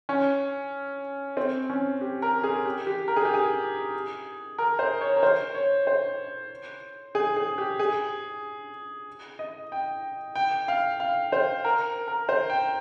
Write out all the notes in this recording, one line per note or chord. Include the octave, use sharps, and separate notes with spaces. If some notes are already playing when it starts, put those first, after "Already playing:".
C#4
C4
C#4
G4
A#4
G#4
G4
G4
A#4
G#4
G4
G#4
A#4
C5
C#5
A#4
C5
C#5
C5
G#4
G#4
G4
G#4
D#5
G5
G5
F5
F5
C5
A#4
A#4
C5
G5